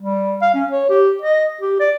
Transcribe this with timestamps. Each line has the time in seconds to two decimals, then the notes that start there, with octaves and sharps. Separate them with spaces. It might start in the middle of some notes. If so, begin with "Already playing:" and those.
0.02 G3
0.42 F5
0.54 C#4
0.71 C#5
0.90 G4
1.22 D#5
1.61 G4
1.80 D5